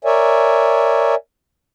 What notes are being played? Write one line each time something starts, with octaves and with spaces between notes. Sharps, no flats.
A#4 C#5 D5 E5 G#5